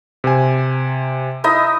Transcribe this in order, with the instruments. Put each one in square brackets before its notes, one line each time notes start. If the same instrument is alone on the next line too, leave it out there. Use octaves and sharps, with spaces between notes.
[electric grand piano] C3 C5 G#5
[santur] D#4 E4 D#5